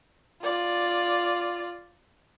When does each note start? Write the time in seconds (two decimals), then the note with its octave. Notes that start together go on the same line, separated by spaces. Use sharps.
0.42 F4 D5